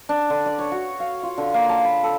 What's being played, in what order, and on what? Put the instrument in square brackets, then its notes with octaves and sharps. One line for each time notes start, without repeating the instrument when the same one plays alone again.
[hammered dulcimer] D4
D3
D5
C#5
F#4
F5
F4
D3
A#3
A5
B5
A4